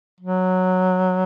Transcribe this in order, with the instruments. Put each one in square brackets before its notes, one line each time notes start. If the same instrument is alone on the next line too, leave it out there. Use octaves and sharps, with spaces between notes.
[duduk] F#3